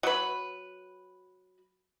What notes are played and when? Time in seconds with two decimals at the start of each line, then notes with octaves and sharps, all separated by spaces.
0.03 F#3 B4